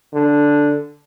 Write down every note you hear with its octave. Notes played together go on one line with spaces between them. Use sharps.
D3